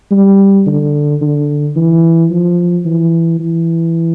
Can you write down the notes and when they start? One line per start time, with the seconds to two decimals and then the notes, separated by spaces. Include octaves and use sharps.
0.11 G3
0.66 D3
1.21 D3
1.76 E3
2.31 F3
2.85 E3
3.40 E3